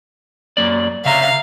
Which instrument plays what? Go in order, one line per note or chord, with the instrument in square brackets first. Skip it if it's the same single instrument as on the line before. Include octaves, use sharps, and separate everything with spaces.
[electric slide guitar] F#2 A#3 D5
[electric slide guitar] C#3 E5 A#5 [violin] F5